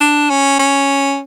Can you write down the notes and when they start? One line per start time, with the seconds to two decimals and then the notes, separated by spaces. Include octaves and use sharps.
0.01 D4
0.30 C#4
0.59 C#4